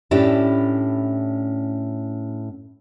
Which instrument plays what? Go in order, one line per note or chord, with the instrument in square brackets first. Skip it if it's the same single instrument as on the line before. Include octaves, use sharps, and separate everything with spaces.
[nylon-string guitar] A2 C#4 D4 E4 G4